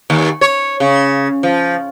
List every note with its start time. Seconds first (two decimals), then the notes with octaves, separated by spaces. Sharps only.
0.10 D#2
0.41 C#5
0.80 C#3
1.43 F3